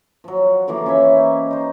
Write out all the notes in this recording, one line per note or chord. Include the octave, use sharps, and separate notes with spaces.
F3 F#3
F#5
D3 E3 F3 A#3
C#4 E4 C#5 E5
D#4
D#4 C5